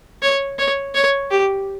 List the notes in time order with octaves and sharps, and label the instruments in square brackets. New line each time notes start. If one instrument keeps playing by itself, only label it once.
[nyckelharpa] C#5
C#5
C#5
G4